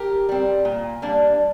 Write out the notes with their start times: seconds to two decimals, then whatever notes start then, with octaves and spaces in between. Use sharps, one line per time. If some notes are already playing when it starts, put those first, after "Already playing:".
Already playing: G4 A#4
0.29 G3 C4
0.65 A#2
1.02 G3 A#3 D4